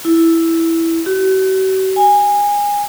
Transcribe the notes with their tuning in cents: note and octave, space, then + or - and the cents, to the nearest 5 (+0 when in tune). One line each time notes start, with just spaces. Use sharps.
E4 +0
F#4 +45
G#5 -20